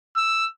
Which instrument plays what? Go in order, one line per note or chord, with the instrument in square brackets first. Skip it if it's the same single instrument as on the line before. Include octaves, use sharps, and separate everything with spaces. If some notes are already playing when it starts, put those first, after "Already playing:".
[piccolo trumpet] E6